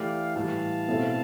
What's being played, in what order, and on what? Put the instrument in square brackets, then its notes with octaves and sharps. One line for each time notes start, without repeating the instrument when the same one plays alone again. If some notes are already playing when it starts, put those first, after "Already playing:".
Already playing: [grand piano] E3 A3 E4 G4 [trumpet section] D5 F5
[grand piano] A2 E3 G3 [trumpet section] F5 A5
[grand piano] B2 A3 C4 E4 A4